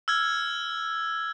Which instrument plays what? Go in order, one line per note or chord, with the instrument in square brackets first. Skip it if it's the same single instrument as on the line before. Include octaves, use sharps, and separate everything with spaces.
[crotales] E6 F6 G#6